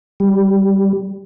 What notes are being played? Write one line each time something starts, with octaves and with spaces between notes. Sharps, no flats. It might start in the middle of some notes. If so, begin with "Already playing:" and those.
G3